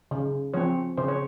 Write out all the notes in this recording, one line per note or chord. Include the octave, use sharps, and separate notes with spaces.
C#3
F3 C4 C#5
C#3 C5
C#5